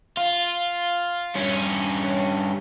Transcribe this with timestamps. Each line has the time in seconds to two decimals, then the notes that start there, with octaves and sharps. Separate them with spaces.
0.17 F4
1.35 G2 C#4